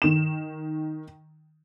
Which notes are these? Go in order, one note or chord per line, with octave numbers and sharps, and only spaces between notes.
D#3 E7